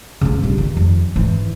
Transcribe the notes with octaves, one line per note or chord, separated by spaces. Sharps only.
C#3 B3
C#2 G2
D#3
F2
G#2 E3